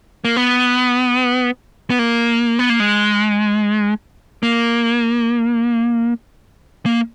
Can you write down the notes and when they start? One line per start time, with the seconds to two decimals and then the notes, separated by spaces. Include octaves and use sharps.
0.25 A#3
0.37 B3
1.90 B3
1.99 A#3
2.59 B3
2.69 A#3
2.80 G#3
4.43 A#3
6.86 A#3